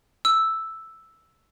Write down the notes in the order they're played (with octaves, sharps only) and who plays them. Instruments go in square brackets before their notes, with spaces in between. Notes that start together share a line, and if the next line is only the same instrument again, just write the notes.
[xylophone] E6